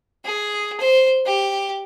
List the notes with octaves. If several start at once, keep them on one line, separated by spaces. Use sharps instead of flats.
G#4
C5
G4